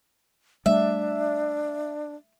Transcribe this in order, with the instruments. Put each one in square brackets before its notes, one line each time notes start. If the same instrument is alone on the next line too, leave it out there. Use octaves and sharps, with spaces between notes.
[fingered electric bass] G3 A3 [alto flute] D4 [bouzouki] E5